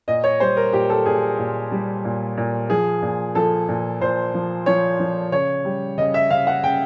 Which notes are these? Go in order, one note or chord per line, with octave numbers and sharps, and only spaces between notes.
A#2 D#5
C#5
G3 C5
A#4
A#2 G4
A4
A#2 G#4
A#2
G3
A#2
A#2
F3 G#4
A#2
F3 A4
A#2
A#2 C5
F3
F3 C#5
F3
C#3 C#5
G3
C#3 D#5
E5
C#3 F5
F#5
C#3 G5